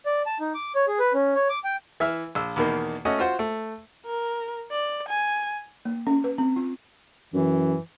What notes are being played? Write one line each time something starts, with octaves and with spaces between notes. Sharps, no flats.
D5
A5
D#4
D6
C#5
G#4
B4
C#4
C#5
D6
G5
E3 E5 E6 F6
A#1 E6
E2 B2 D#3 A#3
A3 C#4 F#4 D#5 F#5
F4 F#4 C5 F#5
A3
A#4
D5
G#5
A#3
C#4
B4
C4
F4
F#2 E3